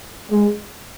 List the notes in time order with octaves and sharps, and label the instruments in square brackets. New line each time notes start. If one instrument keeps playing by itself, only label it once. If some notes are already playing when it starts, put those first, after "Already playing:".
[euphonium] G#3